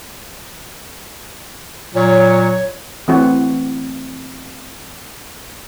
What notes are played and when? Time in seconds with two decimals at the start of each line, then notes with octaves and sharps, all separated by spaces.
1.95 A#2 F#3 C#5
3.08 E3 A3 C4 F#4